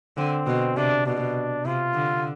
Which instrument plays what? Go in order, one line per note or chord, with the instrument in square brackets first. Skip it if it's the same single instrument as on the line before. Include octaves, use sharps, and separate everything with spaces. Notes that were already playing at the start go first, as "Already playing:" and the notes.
[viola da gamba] D3 [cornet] C4
[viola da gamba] B2
[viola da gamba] C3 [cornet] D4
[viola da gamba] B2 [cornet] D4
[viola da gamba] C3 [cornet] F4
[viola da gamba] D3